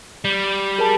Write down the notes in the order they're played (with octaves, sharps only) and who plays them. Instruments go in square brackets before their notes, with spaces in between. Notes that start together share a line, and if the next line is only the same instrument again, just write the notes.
[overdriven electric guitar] G3
[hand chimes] G#4 A#4 A5